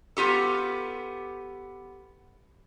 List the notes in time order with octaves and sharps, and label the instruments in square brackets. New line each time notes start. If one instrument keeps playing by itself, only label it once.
[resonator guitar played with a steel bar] B3 F4 G4 A4